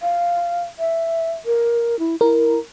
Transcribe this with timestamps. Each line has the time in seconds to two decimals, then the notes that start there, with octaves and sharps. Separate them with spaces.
0.02 F5
0.79 E5
1.45 A#4
1.99 E4
2.21 E4 A#4